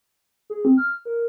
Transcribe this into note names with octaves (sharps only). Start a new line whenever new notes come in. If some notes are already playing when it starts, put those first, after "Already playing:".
G#4
C4
F6
A#4